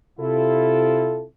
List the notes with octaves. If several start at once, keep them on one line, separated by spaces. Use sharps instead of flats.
C3 E4 F4 A4